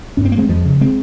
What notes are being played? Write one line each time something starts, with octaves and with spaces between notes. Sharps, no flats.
G2 C#4
C4
A#3
G#3 C4
F2 F3 G#3
C#3
G#3 C4